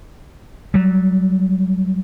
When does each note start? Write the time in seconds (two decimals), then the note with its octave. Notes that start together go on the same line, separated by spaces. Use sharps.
0.74 F#3 G3